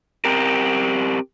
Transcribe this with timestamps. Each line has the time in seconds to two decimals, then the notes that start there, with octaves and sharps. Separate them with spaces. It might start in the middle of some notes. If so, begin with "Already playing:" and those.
0.25 C4 G4 A#4